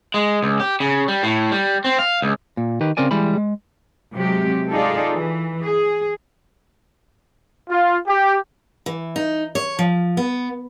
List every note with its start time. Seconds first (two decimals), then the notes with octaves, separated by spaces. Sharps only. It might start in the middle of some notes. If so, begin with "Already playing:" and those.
0.14 G#3
0.43 C#2
0.60 G4
0.80 C#3
1.08 G3
1.23 A2
1.52 G3
1.85 C4
1.99 F5
2.22 C#2
2.57 A#2
2.81 D#3 G4 B4
2.97 C#3 C4 A#4 D5 G#5
3.11 E3 G3 G#3 B5
3.37 G#3
4.14 C3 F#3 G#3 G4
4.73 D#4 F4 G#4 A4 D5
5.15 E3
5.66 G#4
7.70 F4
8.08 G4
8.86 E3
9.16 D#4
9.55 C#5
9.79 F3
10.17 B3